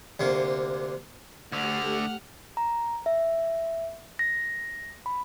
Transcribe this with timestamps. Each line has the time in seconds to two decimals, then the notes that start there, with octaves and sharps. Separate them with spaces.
0.20 D2 C3 A#3
1.52 D2 D3 A3 G4 F#5 F6
2.57 A#5
3.06 E5
4.19 A#6
5.06 B5